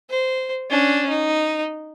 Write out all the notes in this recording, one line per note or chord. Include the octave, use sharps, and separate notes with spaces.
C5
C#4 D4
D#4